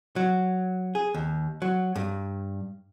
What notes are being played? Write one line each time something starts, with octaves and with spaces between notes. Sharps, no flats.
F#3
G#4
D#2
F#3
G2